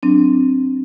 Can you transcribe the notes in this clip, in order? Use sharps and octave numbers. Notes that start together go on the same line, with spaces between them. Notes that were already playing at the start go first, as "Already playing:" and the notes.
F#3 C4 D4